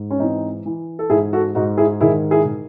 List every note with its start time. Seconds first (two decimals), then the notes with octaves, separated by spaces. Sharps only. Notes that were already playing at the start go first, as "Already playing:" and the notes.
Already playing: G#2
0.11 C#4
0.19 E3 C4 D#4
0.66 E3
0.99 A4
1.10 G#2 E4 G#4
1.33 F#4 A4
1.55 G#2 D#4 F#4
1.78 E4 G#4
2.00 D#3 E4 G#4
2.31 E4 G#4
2.45 D#3